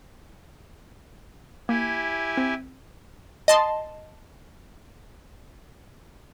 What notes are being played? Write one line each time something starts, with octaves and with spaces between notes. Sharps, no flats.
A#3 E4 G4 G#5
C4
D#5 A5 C6